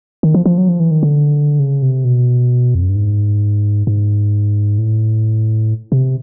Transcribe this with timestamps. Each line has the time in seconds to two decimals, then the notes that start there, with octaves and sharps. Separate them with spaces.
0.23 D#3
0.35 F3
0.46 F3
0.58 F#3
0.69 F3
0.80 E3
0.91 D#3
1.03 D3
1.59 C#3
1.82 C3
2.05 B2
2.75 F2
2.82 F#2
2.89 G2
2.96 G#2
3.87 G#2
4.78 A2
5.92 C3